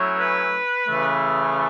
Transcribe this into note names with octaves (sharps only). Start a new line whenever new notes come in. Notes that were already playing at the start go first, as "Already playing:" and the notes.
Already playing: F#3 A3 C#4 E4
B4
C#3 E3 A3